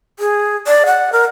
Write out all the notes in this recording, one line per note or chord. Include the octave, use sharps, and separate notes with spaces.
G#4
D5
F#5
A#4